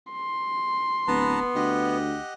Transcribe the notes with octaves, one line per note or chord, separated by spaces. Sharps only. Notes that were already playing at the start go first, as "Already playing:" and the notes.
C6
D1 B3 B4 A5 A#5
D2 G4 D#5 F#5